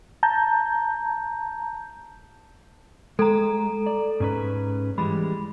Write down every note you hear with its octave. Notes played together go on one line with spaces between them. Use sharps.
A5 A#5 G6
G#3 A4 A#5
D5
G#2 C#4 B4
E3 G3 G#3 B5